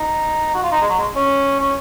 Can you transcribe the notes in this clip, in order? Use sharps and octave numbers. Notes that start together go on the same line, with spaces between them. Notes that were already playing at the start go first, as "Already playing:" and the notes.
Already playing: D#4
F#4
F4
D#4
G#3
F#3
G#3
C#4
C#4